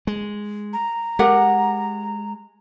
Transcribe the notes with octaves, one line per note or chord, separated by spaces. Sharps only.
G#3
A#5
G#3 G4 A#4 F#5